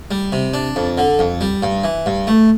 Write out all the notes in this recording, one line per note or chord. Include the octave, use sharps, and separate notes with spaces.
G3
C3
D4
F2
D3
F2
G3
G2
E3
G2
A3